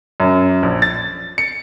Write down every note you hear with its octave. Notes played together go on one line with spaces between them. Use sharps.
F#2
A#1
A6
C#7